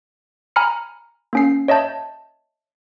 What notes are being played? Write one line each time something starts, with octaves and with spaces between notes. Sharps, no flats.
G#5 A#5 B5 F6 C#7
A#3 C#4 C7
C#5 D#5 E5 A5 G6